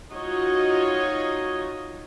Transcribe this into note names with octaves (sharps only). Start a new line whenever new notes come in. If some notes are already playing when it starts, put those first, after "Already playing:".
D#4 F4 F#4 C#5 D#5